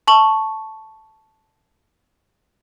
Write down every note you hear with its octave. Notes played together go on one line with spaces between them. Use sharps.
A5 C#6 F#7